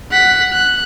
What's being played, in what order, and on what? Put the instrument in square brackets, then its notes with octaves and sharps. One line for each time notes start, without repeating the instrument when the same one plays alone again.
[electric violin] F#5 B6
F#6